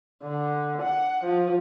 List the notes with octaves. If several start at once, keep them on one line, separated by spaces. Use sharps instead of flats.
D3
F#5
F3